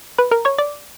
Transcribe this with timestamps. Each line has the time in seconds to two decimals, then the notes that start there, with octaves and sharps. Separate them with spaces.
0.18 B4 B5
0.31 A#4 A#5
0.45 C#5 C#6
0.58 D5 D6